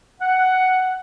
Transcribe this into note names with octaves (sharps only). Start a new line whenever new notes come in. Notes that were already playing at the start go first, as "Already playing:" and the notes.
F#5